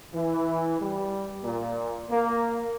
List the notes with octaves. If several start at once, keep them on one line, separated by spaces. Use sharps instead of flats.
E3
G3
A#2
A#3